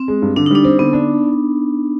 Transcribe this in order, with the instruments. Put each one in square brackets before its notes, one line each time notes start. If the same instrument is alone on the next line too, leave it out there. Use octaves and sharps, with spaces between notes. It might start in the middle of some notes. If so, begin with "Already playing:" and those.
Already playing: [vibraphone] C4
[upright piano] G#3
G2
[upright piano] D3 [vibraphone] D4
[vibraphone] D#4
[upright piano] G3 [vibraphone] D4
[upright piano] C4
[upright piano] D3 [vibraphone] B3
[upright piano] D4